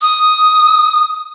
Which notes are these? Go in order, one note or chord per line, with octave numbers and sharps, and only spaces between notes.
D#6